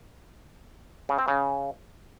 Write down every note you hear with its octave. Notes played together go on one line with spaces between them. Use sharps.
C#3
C4
C#3